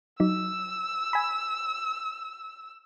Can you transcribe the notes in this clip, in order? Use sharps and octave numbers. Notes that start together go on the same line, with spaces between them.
F#3 D#4 E6
G#5 B5